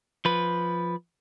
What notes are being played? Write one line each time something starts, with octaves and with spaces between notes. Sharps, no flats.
F3 B4